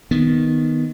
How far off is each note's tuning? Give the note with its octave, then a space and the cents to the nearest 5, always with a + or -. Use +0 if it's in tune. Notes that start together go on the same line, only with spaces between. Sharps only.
D#3 +0 B3 +0